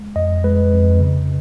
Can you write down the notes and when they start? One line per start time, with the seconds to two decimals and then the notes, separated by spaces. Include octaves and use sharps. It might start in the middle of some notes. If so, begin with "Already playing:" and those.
Already playing: G#3
0.16 F2 D#5
0.44 G#3 B4
0.72 F2
1.00 C#3